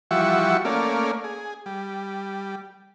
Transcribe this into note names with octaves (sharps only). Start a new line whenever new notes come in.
E3 F3 G3 F#4 E5 C#6
A3 A#3 C#4 D5 F5
G#4
G3